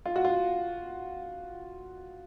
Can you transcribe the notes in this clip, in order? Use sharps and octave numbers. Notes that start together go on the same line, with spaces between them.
F4
F#4
F4